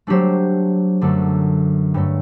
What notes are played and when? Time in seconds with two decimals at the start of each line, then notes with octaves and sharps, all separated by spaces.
0.07 F#3 A3 D4 G4 C5
1.01 F#2 D3 A3 D4 A4
1.94 G2 F#3 A3